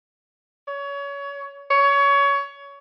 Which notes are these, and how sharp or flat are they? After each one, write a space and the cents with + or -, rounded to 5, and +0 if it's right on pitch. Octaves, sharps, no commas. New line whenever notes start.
C#5 +25
C#5 +20